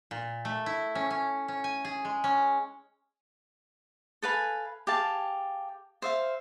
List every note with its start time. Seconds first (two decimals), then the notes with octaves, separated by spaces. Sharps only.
0.11 A#2
0.45 A3
0.66 E4
0.95 C#4
1.11 C#4
1.48 C#4
1.64 G#5
1.85 G#4
2.05 G#3
2.24 C#4
4.22 A4 B4 F5 G#5
4.87 G4 G#4 F5 A5
6.02 C5 E5 F5